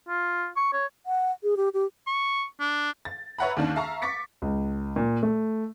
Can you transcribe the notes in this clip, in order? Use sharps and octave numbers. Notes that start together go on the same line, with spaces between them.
F4
C#6
C#5
F#5
G#4
G4
G4
C#6
D4
A6
B4 C#5 E5 F#5 A#5 B5
D#2 D#3 C#4 D4
E5 F5 A5 A#5 C#6
C#6 D6 A6 B6 C#7
C#2
A#2
A3